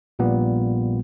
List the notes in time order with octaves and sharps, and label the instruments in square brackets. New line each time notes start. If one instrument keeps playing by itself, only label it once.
[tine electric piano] A#1 A#2 G3 B3